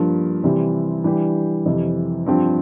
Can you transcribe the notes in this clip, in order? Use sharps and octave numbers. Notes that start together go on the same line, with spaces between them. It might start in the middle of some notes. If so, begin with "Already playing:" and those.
Already playing: G2 F3 A#3
C3 E3 G3 C4
E3 G3 D4 G4
F2 C3 E3
G2 F3 C4 G4